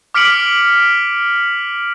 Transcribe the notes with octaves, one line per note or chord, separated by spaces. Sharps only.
D6 F6 B6 C#7 D7 F#7